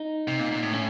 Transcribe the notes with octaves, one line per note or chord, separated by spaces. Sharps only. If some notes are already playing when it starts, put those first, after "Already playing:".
Already playing: D#4
C3
A#2
A#2
A2
C#4